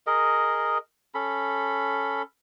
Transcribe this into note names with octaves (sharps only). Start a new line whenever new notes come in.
G#4 A#4 D#5
C#4 A4 B5